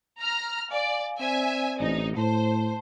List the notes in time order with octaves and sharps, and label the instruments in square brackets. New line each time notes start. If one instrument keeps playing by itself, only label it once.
[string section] A#5 F6
[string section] D5 [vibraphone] F5 G#5
[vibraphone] C4 C5 D5 [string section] E5 G#5
[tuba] A1 [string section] A2 D#4
[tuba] A2 [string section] C5 [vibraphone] A5